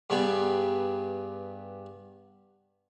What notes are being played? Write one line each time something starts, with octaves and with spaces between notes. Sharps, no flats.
G2 G3 B3 G#4